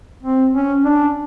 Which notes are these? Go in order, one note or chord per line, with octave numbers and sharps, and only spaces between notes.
C4
C#4
D4